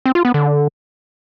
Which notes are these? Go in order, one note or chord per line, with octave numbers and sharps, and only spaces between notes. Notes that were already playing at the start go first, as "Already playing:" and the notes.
C4
F4
B3
D3